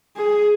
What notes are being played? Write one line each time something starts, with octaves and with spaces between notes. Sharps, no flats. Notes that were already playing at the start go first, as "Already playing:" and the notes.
G#4